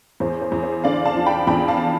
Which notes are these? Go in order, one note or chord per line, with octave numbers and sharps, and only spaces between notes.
E2 C5
C5
E2
C5
D3 D5 F5
F5 A5
F3
G5 B5
E2 G5 B5
F5 A5